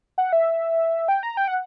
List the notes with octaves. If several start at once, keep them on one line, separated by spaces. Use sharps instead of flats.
F#5
E5
G5
A#5
G5
F#5